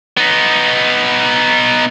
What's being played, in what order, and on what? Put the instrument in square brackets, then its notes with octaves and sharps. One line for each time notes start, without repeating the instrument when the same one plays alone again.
[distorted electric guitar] B3 D#4